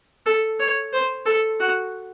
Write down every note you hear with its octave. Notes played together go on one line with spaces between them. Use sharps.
A4
C#5
C5
A4
F#4